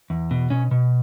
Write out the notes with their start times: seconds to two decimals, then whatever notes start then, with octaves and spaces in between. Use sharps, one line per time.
0.10 E2
0.31 B2
0.50 B2 C#4
0.71 B2